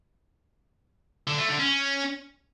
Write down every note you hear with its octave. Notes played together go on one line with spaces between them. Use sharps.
D3
A3
D3
C#4